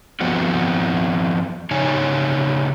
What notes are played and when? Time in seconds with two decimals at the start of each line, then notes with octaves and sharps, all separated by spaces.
0.21 F3 B3 C4 F#4
1.71 C#3 D#4 G4 C#5 G#5